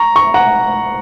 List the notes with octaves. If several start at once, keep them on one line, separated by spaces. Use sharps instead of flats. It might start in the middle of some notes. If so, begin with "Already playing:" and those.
Already playing: A#5 C#6
A#5 C#6
F#5 A#5